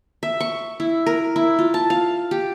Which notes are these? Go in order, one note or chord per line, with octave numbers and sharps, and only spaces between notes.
E5
C#6
E4
A#4
E4
F4
A5
F5
G4